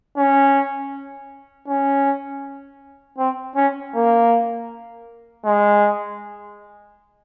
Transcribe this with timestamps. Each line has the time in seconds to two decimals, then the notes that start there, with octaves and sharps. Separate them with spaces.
0.17 C#4
1.68 C#4
3.18 C4
3.56 C#4
3.95 A#3
5.45 G#3